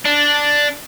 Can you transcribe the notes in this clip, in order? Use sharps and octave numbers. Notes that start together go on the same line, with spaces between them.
D4